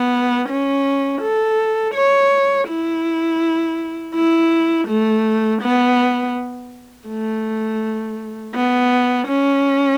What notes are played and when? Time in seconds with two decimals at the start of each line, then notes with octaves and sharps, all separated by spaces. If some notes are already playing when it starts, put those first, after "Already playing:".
Already playing: B3
0.49 C#4
1.22 A4
1.95 C#5
2.69 E4
4.15 E4
4.88 A3
5.62 B3
7.09 A3
8.55 B3
9.28 C#4